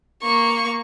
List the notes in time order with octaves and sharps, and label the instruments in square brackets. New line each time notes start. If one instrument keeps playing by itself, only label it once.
[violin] A#3 C#6